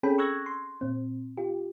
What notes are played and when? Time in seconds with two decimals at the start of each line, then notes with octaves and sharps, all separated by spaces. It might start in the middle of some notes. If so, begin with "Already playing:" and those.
0.03 C4 C#4 G#4 A4 G5 B5
0.18 C#6 E6 F#6 G#6 A#6
0.46 C6
0.81 A#2 C4
1.37 F4 G4